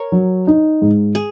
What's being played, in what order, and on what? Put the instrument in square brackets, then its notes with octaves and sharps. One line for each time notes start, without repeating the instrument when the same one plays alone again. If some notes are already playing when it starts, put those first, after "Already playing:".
Already playing: [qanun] A#4 C#5
[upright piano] F#3
D#4
G#2
[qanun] G#4